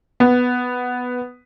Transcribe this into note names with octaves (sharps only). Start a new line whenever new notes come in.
B3